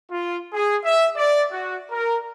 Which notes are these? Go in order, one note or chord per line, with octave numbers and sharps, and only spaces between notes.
F4
G#4
E5
D5
F#4
A#4